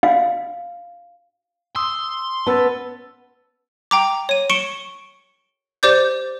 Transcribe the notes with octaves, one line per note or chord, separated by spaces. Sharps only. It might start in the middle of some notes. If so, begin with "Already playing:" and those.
F5
C6 D#6 E6
B3 C#4 B4 A5 E6 A6
G5 A#5 D6
C#5 D#7
C#6 C#7 D7 E7 G7
G4 C5 D5 D6 G6